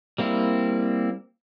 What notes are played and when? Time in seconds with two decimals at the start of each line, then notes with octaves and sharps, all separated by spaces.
0.18 G3 A#3 C4 E4